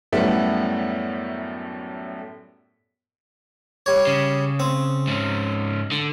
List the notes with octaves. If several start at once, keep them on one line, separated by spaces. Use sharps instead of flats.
F#2 A2 G3 A3 B3
G3 C#5
C#3
C4
G#2 C#4
D3